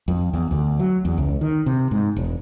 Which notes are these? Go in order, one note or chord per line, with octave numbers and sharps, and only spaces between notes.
F2
E2
D2
F#3
E2
C#2
D#3
C3
G#2
E1